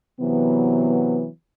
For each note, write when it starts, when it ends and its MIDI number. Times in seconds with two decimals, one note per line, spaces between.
0.21 1.26 48
0.21 1.26 52
0.21 1.26 54
0.21 1.26 59